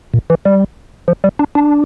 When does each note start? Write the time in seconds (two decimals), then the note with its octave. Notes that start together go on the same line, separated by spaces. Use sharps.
0.14 A#2
0.30 E3
0.45 G3
1.08 F3
1.24 G3
1.39 D4
1.55 D4